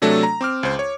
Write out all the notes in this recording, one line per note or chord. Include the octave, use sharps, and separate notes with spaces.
C3 F#3 A3 D4 A4
A#5
C4 D6 F6
C#2 C5
C#5